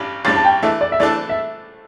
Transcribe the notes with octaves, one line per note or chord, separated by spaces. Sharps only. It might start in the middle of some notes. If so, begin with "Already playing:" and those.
Already playing: A1 G2 G3 D4
A1 G2 G3 D4 A6
A5
G5
E3 A3 D4 A4 E5
D5
E5
E3 A3 D4 A4 D5
E5